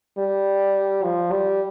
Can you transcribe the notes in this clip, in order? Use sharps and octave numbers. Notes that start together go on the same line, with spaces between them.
G3
F3
G3